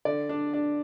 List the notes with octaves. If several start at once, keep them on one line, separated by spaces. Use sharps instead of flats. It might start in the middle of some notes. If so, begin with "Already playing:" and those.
D3 D5
D4
D4